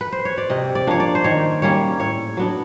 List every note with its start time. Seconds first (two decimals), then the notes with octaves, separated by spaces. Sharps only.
0.01 B4
0.12 C5
0.25 C#5
0.38 D5
0.50 C3 D#5
0.75 D5
0.87 F3 A#3 D4 C#5
1.00 D5
1.15 C5
1.24 D#3 C#5
1.62 G3 A#3 C#4 C#5
2.00 A2 C#5
2.37 F#3 B3 D4